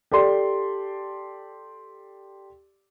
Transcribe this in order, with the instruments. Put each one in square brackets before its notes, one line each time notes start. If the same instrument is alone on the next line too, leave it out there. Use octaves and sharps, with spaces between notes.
[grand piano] G4 A4 D5 C6